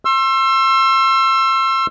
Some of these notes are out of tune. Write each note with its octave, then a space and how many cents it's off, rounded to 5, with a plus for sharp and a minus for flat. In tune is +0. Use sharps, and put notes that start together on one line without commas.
C6 +35 E6 +25